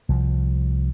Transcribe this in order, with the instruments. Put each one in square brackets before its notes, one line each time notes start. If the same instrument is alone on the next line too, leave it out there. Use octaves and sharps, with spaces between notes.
[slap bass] C2 F3